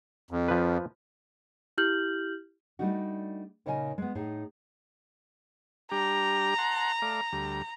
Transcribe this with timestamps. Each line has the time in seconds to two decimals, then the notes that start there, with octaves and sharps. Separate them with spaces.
0.31 F2
0.48 F3 B4
1.78 E4 G4 F6 G6 F#7
2.79 G3 A3 D4 D#4 F#4
3.66 A#2 C#3 D#4 D#5 G5 G#5
3.98 G#3 B3
4.15 A2 D#4 G#4
5.92 G3 D4 G4 A#5
6.58 F#5 A5 C6
7.02 A3 D5 F5
7.32 D2 G3